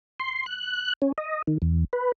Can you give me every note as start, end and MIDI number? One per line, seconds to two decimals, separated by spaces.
0.20 0.46 84
0.46 0.93 90
1.02 1.12 61
1.18 1.42 75
1.47 1.58 51
1.62 1.84 40
1.93 2.12 71